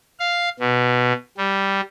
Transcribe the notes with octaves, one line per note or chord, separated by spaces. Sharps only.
F5
B2
G3